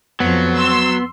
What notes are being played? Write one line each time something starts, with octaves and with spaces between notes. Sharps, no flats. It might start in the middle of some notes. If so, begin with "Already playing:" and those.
F2 F3 F#3 B3
C6 E6